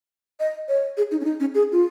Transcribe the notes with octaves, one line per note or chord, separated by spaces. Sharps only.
D#5
C#5
G#4
D#4
C#4
D#4
C#4
G#4
F4